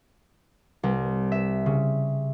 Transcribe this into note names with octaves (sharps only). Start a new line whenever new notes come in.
C2
E5
C#3